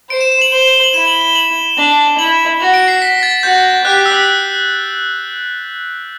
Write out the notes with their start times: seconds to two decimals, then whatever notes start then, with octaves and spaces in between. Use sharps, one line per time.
0.10 C5 D7
0.21 E7
0.32 E7
0.42 F#7
0.52 C5 G7
0.62 G7
0.73 G7
0.84 F#7
0.94 E4 E7
1.08 F#7
1.21 G7
1.35 F#7
1.78 D4
2.18 E4 F#7
2.61 F#4
2.74 D7
2.88 C7
3.02 B6
3.23 A6
3.43 F#4 G6
3.84 G4 F#6
4.06 E6